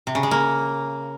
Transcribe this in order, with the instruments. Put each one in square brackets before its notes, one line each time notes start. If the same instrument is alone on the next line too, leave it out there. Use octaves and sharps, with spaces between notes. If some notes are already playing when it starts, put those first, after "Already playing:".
[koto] C3
C#3
G#3
A#3